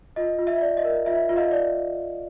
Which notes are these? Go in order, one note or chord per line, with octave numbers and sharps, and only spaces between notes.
F4 D#5
F4
E5
D5
D#5
A#4
F4 E5
F4
D#5 F5
D5